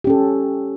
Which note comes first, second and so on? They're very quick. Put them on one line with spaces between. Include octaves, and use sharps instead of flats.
G4 C#4 A4